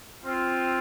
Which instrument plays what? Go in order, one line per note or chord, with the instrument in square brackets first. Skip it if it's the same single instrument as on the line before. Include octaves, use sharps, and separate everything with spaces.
[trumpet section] C4 F4